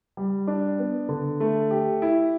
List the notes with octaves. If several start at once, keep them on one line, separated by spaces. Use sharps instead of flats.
G3
D4
B3
D3
A3
G4
E4